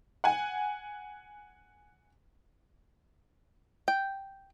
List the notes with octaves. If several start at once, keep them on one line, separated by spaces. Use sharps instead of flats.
F#5 G#5
G5